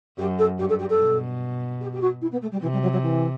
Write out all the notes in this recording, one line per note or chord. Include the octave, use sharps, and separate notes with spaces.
F#2 G4
A4
G2 G4
A4
G4
A4
B2
G4
G4
F#4
E4
B3
A3
G3
C3 E3
G3
F#3
F#3
E3